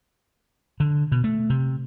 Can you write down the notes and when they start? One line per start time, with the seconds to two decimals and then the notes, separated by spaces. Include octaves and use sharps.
0.80 D3
1.12 B2
1.24 A3
1.50 C3